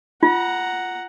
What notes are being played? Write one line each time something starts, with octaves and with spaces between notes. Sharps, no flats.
F4 F#5 A#5